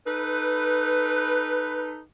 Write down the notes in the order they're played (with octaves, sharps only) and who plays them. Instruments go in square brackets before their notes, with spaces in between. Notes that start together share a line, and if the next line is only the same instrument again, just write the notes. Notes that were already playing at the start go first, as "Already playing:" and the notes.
[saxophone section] D#4 A4 B4